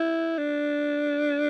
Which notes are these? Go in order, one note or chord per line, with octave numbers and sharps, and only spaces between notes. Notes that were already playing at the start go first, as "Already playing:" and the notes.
Already playing: E4
D4